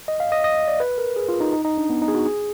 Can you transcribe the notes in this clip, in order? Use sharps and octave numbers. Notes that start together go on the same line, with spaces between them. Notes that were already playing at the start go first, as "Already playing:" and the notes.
D#5
F5
D#5
D#5
D5
B4
A#4
G#4
F4
D#4
D#4
D#4
D4
B3
D#4
G#4
F#4
G#4